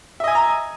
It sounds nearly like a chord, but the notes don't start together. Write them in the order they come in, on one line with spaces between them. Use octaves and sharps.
E5 D#5 G#5 D#6 A#5